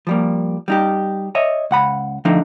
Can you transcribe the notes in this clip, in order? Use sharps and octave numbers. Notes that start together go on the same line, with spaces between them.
F3 G3 A#3
G3 D#4 G4
C#5 D#5 E5
C#2 F#5 B5
D3 F3 A3 D4 D#4